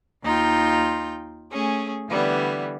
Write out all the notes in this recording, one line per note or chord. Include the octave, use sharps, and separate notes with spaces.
D#2 D#4 F4 G5 C6
A3 C#4 G#4
D3 E3 G3 B3